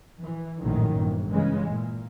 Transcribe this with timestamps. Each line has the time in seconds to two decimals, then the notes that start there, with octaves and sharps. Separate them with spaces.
0.23 E3
0.63 A#1 F#2 A2 D#3
0.97 G1 A#2
1.30 C#3 E3 G#3
1.69 A#2